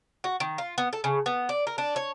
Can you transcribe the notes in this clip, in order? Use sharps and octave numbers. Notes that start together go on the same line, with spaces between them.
F#4
D#3
F4
B3
A4
C#3
B3
D5
A#4
D4
C#5